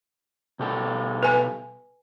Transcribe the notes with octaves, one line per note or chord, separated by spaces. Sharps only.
B2 G4 A4
B4 G#5